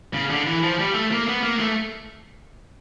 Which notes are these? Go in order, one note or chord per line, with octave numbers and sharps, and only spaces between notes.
C#3
D3
E3
F3
G3
A3
A#3
B3
A#3
A3